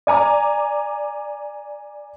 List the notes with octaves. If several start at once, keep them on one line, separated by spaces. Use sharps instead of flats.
D5 G#5 A#5 D6